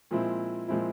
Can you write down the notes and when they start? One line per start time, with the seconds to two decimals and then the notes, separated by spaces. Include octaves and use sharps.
0.11 A#2 F3 G#3 C4 E4
0.68 A#2 F3 G#3 C4 E4